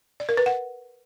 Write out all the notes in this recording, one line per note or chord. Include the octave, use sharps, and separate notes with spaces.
D5
A#4
B4
F#5